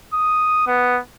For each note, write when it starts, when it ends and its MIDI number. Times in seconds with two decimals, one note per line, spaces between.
0.14 0.66 87
0.67 0.99 59